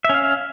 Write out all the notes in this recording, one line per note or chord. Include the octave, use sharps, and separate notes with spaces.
C#4 E5 F5